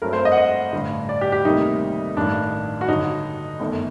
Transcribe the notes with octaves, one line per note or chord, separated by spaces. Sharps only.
G2 F#3 A3 C4 A#4
C5
D#5
F#5
D#5
A1 G2 D3
D5
G4
G4
D2 C3 D#3 G3 A#3 D#4
A1 G2 D#3 D4
F#4
G2 D3 F#3 D#4
G1 F#2 D#3 A3